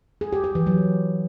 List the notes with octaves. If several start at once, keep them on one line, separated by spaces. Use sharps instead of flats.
G#4
G4
G4
E3
F#3